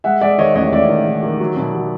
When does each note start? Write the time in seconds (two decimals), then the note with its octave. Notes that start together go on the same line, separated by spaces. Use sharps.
0.04 G#3 E5 F#5
0.21 G#3 D5 E5
0.38 D#3 C#5 D#5
0.55 A1 C#5 D#5
0.72 A1 D5 E5
0.89 D#3
1.06 D#3
1.23 D#3
1.40 F#3
1.56 B2
1.74 F#3